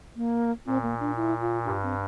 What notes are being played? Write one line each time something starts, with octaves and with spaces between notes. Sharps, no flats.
A#3
A#2 C4
A#3
D4
E4
F4
G2 G4
C4